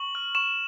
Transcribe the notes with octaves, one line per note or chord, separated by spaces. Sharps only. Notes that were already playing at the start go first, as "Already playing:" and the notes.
Already playing: C#6 F#7
F6
C#6 E7